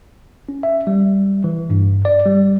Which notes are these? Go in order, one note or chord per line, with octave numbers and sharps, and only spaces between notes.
C#4
E5
G3
E3
G2
D5
G3